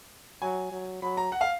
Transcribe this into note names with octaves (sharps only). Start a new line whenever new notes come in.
F#3 G#5
F#3
F#3 B5
A#5
F#5
F5